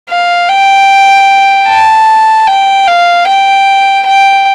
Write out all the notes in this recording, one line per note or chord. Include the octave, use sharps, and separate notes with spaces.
F5
G5
A5
G5
F5
G5
G5